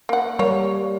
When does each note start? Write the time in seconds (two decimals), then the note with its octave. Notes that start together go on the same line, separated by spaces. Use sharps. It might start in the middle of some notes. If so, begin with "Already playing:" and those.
0.09 A#3 F#5
0.39 G3 A#3 C#5